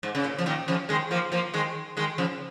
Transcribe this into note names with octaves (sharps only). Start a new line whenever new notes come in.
G#2
C#3
A#2
F3
A#2 D#3
C#3 F3
D#3 G#3
F3 A#3
F3 A#3
D#3 G#3
D#3 G#3
C#3 F3